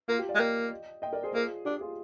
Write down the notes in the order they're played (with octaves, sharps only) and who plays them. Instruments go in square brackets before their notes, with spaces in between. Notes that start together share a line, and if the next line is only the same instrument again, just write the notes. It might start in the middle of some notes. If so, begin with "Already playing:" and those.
[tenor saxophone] A#3 [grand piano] F4
[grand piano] G4
D5 F5
[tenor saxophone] G#3
[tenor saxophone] A#3 [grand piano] D#5 G5
[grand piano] D#5 G5
A#4 D5
G#4 C5
[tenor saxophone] A#3 [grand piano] F4 G#4
[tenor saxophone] D4 [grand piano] G4
[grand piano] F4 G#4